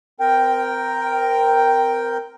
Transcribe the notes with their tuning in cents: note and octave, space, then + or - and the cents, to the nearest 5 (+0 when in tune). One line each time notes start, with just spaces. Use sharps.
C4 -25 A#4 +0 G5 +0